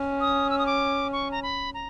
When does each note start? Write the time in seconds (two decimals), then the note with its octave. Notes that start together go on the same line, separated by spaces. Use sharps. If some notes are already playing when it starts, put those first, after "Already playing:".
Already playing: C#4
0.21 D#6
0.50 E6
0.59 D#6
0.66 D6
1.13 C#6
1.31 A#5
1.43 B5
1.74 A#5